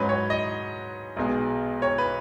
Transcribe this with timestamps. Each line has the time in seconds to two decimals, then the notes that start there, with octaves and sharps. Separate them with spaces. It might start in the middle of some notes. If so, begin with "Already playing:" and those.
Already playing: G#2 F#3 C#4 B4
0.09 C#5
0.30 D#5
1.16 B1 B2 G#3
1.82 C#5
1.98 B4